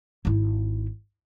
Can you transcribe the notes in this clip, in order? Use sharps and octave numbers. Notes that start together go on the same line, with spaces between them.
G#1 E4